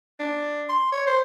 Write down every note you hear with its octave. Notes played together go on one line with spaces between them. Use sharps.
D4
C6
C#5
C5